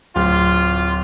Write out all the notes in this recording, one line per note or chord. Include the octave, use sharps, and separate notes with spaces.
D1 F4